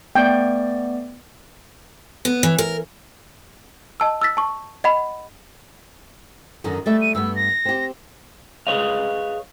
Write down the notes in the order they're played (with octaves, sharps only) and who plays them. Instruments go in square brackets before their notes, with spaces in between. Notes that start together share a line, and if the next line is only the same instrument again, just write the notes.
[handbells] A3 B3 D5 [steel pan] G5
[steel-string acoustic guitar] B3
E3
A#4
[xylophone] D#5 A5 E6
E6 F6 A6 B6
A5 C#6
D#5 F#5 B5
[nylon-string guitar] F#2 D3 D#3
[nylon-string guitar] G3 A3 E5 [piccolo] A6
[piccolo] D#7
[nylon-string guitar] G2 A3 B3 [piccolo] E6
[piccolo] A#6
[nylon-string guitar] C4 G4
[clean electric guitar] G#4 A4 B4 C#5 D#5 F5